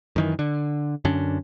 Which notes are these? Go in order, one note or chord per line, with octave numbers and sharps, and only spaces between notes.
F#2 D#3 E3
D3
F#2 D3 C#4 D4